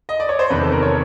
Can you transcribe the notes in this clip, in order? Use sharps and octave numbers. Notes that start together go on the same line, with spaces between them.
D#5
D5
C#5
C5
E2 C3 D#3 B4
A4
A#4
C#5